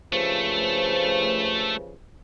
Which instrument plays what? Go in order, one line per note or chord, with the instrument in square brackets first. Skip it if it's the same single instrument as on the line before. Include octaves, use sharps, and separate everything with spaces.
[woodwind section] G2 C#3 F3 [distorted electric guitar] A3